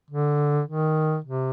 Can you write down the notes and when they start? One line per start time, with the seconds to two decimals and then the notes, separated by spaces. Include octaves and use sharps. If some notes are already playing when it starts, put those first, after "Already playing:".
0.10 D3
0.67 D#3
1.24 C3